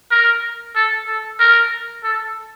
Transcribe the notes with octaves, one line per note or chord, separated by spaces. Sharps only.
A#4
A4
A4
A#4
A4